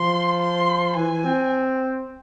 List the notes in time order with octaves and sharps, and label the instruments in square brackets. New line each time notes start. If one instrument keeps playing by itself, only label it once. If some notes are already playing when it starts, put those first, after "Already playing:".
Already playing: [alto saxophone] F3 [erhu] C6
[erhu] C6
[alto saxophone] E3 [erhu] G#5
[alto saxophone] C4